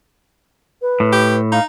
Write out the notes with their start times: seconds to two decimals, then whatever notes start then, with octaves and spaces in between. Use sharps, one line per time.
0.82 B4
1.00 A2
1.13 G4
1.52 D#4 F5